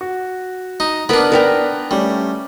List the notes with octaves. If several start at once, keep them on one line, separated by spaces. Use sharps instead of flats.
F#4
D#4
B3 D4 A#4 B5
A#4 B4 D5 G5 A#5
G3 A3 C#4